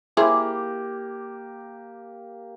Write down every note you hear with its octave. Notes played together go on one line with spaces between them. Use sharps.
A#3 E4 G4 G#4 C5